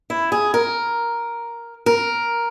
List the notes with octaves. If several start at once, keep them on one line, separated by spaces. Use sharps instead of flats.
E4
G#4
A#4
A#4